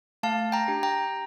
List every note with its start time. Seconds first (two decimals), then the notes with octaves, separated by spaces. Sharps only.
0.23 A3 F5 A5
0.52 G5 A#5
0.68 D4 G4
0.83 G5 A#5